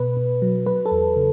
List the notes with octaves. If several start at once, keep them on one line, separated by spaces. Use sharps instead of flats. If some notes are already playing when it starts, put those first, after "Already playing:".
Already playing: B2 B4
B2
F#3
F#3 B4
A4
E2
C#3